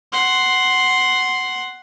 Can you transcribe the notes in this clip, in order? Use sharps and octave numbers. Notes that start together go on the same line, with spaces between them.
F#5 C6